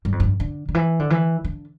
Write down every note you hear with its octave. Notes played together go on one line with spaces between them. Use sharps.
G2
F2
G2
D3
D3
E3
D3
E3
D3